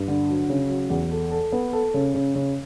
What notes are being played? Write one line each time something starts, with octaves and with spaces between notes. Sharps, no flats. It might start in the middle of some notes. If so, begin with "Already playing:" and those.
Already playing: G2
D3
F#3
C#3
F#3
E2
A4
A4
B3
A4
C#3
C#3
C#3